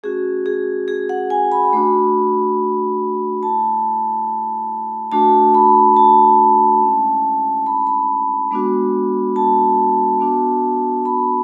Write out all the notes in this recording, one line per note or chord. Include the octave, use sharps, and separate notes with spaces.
A3 C#4 F#4 G#4
G#4
G#4
F#5
G#5
B5
A3 D4 F#4
A3 E4 A5
A3 D4 F#4 A5
B5
A5
G#3 C#4 E4
B5
B5
G#3 B3 D4 F#4
A5
B3 D4 F#4
B5